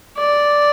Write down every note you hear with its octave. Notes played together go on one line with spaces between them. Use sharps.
D5